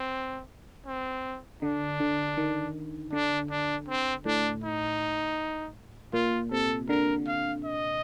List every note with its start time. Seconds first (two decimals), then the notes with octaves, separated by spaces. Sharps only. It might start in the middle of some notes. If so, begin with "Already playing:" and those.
Already playing: C4
0.86 C4
1.62 D3 D4
2.00 D3
2.37 D#3
3.13 D3 D4
3.50 D4
3.88 C4
4.25 A2 D4
4.64 D#4
6.13 A#2 F4
6.51 C3 A4
6.89 D3 A#4
7.26 F5
7.65 D#5